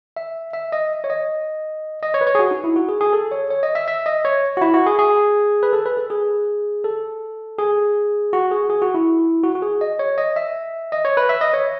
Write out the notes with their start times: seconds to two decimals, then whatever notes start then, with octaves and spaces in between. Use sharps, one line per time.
0.17 E5
0.53 E5
0.72 D#5
1.04 C#5
1.10 D#5
2.03 D#5
2.14 C#5
2.21 B4
2.27 C#5
2.35 G#4
2.39 F#4
2.51 D#4
2.64 E4
2.76 F#4
2.89 G#4
3.01 G#4
3.13 A4
3.32 C#5
3.51 C#5
3.63 D#5
3.75 E5
3.88 E5
4.06 D#5
4.25 C#5
4.57 F#4
4.61 E4
4.74 F#4
4.86 G#4
4.99 G#4
5.63 B4
5.73 A4
5.86 B4
5.97 A4
6.10 G#4
6.84 A4
7.58 G#4
8.33 F#4
8.51 G#4
8.70 G#4
8.82 F#4
8.94 E4
9.43 F#4
9.55 F#4
9.62 G#4
9.81 D#5
9.99 C#5
10.18 D#5
10.36 E5
10.92 D#5
11.05 C#5
11.17 B4
11.29 E5
11.41 D#5
11.53 C#5